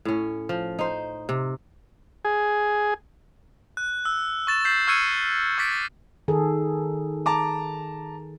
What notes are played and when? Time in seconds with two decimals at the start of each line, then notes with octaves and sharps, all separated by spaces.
0.05 A2 C#4
0.49 F3
0.79 D#4 C5
1.29 C3
2.25 G#4
3.77 F#6
4.05 E6
4.47 C#6 A6 E7
4.65 G6 A6 B6 C7 E7 F#7
4.87 C#6 E6 F6 G#6 C#7 D#7
5.58 C#6 D6 E6 A6 B6 D7
6.28 D#3 G#4 A4
7.26 A5 A#5 D6